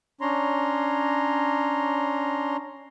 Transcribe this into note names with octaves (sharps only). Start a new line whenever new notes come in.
C#4 D4 C#5 A#5 C6